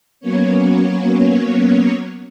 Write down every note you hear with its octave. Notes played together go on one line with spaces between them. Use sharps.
F#3 A#3 B3 C#4 C#5